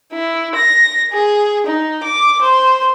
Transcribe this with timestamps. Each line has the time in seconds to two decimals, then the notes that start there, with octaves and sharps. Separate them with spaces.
0.13 E4
0.55 A#6
1.13 G#4
1.66 D#4
2.03 D6
2.42 C5